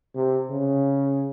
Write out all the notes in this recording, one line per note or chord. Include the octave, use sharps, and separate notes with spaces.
C3
C#3